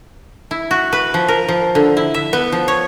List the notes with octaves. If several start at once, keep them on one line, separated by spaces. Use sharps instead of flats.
E4
F#4
B4
F3
A#4
F3
D3
E4
E5
B3
F3
C#5